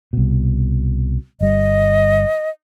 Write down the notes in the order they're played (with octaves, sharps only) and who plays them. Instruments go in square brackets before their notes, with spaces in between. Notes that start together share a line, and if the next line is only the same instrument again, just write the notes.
[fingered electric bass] C2 B2
[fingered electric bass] G1 G3 [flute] D#5